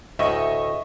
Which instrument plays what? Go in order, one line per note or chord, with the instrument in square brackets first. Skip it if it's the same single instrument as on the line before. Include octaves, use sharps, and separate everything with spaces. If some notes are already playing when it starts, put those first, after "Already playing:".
[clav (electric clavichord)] D2 A2 [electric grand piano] D#5 E5 [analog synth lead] C#6